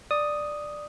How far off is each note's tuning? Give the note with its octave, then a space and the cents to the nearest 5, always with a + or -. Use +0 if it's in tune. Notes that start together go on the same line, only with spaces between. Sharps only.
D5 +10 D#6 +0